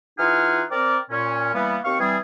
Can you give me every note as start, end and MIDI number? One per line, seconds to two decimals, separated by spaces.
0.18 0.63 52
0.18 0.63 63
0.18 0.63 65
0.18 0.63 68
0.18 0.63 78
0.18 0.63 89
0.71 0.98 60
0.71 0.98 70
0.71 0.98 74
1.11 1.51 46
1.11 1.51 61
1.54 1.78 52
1.54 1.78 55
1.54 1.78 58
1.54 1.78 59
1.85 1.99 39
1.85 1.99 60
1.85 1.99 77
1.85 1.99 85
2.00 2.18 52
2.00 2.18 55
2.00 2.18 60
2.00 2.18 68